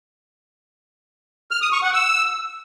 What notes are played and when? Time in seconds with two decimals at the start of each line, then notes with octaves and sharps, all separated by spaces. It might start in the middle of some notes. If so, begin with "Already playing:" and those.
1.51 F6
1.62 D#6
1.72 C#6
1.83 F#5
1.93 E6